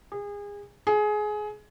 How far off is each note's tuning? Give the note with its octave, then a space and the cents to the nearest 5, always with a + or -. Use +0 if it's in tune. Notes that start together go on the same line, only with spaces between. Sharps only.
G#4 -30
G#4 +20